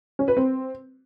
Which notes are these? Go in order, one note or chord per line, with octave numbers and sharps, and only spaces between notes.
C#4
B4
C4